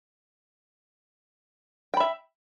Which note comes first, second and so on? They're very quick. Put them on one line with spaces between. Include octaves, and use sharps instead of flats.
G5 B5 E5